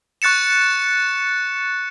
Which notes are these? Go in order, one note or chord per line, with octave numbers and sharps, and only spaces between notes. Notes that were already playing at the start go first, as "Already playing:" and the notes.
C#6 F#6 A6 C#7 E7